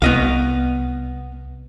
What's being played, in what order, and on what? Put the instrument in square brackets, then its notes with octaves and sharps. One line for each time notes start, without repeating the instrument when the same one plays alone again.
[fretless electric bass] C2 [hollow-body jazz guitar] B3 D#5 F5